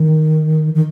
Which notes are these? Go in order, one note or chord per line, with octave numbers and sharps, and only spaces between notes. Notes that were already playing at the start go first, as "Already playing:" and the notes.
Already playing: D#3
D#3